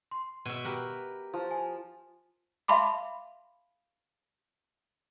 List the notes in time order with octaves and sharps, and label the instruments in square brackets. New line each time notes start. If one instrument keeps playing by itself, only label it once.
[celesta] C6
[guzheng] B2 E5 [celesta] D#7
[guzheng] G4 A#4 B4
[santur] F3
[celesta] G#5
[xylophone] E5 F5 A5 B5 C6 D6